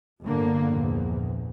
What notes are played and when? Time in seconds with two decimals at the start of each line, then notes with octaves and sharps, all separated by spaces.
0.22 G1 D3 A#3
0.73 A#1 E2